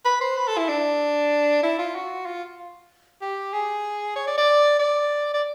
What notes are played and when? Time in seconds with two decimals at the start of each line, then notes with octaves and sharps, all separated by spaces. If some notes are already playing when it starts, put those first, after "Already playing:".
0.05 B4
0.21 C5
0.37 B4
0.48 A4
0.58 E4
0.69 D4
1.63 E4
1.78 F4
1.95 F#4
2.26 F4
3.22 G4
3.53 G#4
4.16 C#5
4.27 D5
4.38 D5
4.79 D5
5.34 D5